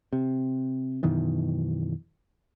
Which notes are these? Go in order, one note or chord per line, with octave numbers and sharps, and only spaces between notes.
C3
F#2 B2 D#3 E3